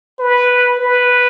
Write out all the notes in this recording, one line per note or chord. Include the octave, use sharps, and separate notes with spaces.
B4
B4